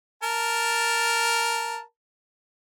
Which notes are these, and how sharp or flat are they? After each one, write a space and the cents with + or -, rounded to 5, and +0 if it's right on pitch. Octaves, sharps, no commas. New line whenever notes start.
A#4 +0 A5 +0